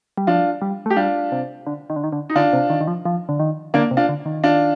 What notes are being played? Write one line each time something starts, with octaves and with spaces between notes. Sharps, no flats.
G3
F3 D4 F4
G3
A3 G4
G3 D4 F4
C3
D3
D#3
D3
D#3
D3
D#4
D3 D4 F4
C3
D#3
D#3
F3
F3
D3
D#3
D3 A#3 D4
C3
D4 F4
D3
D#3
D4 F4